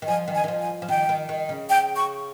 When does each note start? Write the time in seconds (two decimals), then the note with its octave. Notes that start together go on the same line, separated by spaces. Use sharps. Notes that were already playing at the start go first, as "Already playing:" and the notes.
0.02 D#3
0.07 F3 G#5
0.28 D#3
0.35 G#5
0.44 D#3
0.48 F3
0.62 G#5
0.82 F3
0.89 D#3 G5
1.09 D#3
1.29 D#3
1.49 C#3
1.70 G5
1.96 C#6